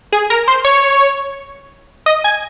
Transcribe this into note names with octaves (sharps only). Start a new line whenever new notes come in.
G#4
A#4
C5
C#5
D#5
G#5